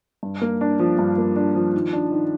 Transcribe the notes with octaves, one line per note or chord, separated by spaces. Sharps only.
G2
A#3
D4
F3
G2
A#3
D4
F3
D#3
D4
D#3